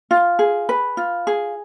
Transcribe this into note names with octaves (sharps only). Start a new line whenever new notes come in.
F4
G#4
B4
F4
G#4